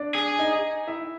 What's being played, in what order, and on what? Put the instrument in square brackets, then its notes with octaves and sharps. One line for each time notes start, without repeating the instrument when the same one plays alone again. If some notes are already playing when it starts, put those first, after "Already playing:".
Already playing: [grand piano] D4 D5
[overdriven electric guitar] G#4
[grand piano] D#4 D#5
E4 E5